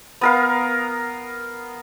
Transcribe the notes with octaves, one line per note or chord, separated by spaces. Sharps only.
B3 A#4 F5